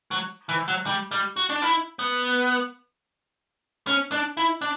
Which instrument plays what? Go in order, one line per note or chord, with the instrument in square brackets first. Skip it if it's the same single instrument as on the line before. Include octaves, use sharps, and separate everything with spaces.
[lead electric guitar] F#3
E3
F#3
G3
G3
F#4
D4
E4
B3
C#4
D4
E4
D4